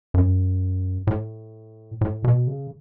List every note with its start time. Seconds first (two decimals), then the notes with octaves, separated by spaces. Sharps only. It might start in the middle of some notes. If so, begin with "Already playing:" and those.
0.14 F#2
1.07 A2
2.01 A2
2.24 B2
2.47 C#3